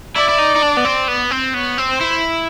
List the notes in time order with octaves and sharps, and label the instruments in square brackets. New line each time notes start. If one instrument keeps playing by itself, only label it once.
[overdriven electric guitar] E4 [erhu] D5
[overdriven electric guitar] E4
D#4
D#4
D4
B3
C4
B3
C4
[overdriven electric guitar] B3 [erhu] C#5
[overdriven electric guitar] C4
[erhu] C5
[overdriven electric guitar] E4